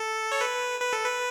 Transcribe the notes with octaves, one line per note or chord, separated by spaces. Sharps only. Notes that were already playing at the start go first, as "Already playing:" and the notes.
Already playing: A4
C#5
B4
B4
A4
B4